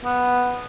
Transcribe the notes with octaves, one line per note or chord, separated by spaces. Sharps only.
B3